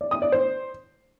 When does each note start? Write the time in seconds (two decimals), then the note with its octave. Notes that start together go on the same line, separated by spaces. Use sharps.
0.01 D5
0.11 D#6
0.22 D5
0.32 C5